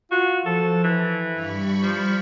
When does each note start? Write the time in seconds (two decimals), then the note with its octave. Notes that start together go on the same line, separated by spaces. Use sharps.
0.11 F4 F#4
0.46 F3 A4
0.84 E3
1.33 G2 G3 B5 C#6
1.83 F3